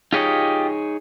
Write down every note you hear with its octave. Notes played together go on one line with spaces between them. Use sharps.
D#4 F4 G4 G#4 C#5 D#5